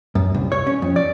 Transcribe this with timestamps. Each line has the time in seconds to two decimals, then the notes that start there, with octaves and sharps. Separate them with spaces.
0.15 F#2
0.34 C2
0.52 C#5
0.67 C#4
0.82 F2
0.96 D5